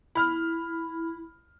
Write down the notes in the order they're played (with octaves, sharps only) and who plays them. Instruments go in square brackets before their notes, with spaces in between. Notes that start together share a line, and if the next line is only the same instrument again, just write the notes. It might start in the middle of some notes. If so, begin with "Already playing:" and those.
[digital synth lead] E4 [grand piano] B5 F6